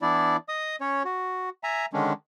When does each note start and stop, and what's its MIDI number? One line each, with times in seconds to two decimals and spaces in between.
0.02 0.36 52
0.02 0.36 59
0.02 0.36 62
0.02 0.36 64
0.02 0.36 74
0.49 0.76 75
0.49 0.76 87
0.81 1.03 61
0.81 1.03 73
1.05 1.49 66
1.63 1.86 76
1.63 1.86 80
1.63 1.86 82
1.93 2.13 50
1.93 2.13 51
1.93 2.13 56
1.93 2.13 61
1.93 2.13 62